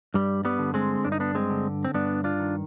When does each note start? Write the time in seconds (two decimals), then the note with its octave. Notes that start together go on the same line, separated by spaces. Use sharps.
0.14 G2 G3
0.45 G3 B3
0.59 D3
0.74 G#3 C4
1.05 G2 D4
1.12 D#4
1.20 B3 D4
1.35 G#3 C4
1.50 D3
1.85 C4
1.94 G2 B3 D4
2.24 D4 F4
2.39 D#3